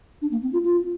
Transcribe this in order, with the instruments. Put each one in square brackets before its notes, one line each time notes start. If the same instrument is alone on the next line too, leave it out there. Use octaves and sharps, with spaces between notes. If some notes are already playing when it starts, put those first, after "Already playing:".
[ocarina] D4
A#3
C4
F4
F4